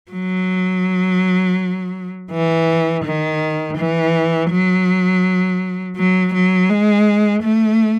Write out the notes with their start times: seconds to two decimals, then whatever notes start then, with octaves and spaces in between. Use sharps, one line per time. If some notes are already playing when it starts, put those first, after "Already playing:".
0.12 F#3
2.31 E3
3.05 D#3
3.77 E3
4.51 F#3
5.97 F#3
6.34 F#3
6.70 G#3
7.43 A3